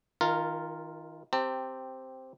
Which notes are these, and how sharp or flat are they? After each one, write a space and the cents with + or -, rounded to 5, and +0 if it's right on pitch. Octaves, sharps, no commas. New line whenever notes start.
D#3 +30 F4 +0 A#4 -10
C4 +0 G4 -5 A5 +45